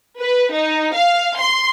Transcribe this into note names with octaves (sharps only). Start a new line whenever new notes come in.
B4
D#4
F5
C6